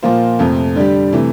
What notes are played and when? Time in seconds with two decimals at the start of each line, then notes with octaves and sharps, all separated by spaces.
0.02 A#2 F3 A#3 F4 C5
0.39 F2 C3 F3 A3
0.75 D3 G3 D4 G4
1.13 C3 E3 A3